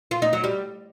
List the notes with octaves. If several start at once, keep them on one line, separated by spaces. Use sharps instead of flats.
F4
D#4
F#3
G3